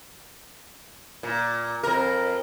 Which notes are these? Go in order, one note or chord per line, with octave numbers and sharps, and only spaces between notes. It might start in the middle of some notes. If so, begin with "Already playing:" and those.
A#2
F2 A#4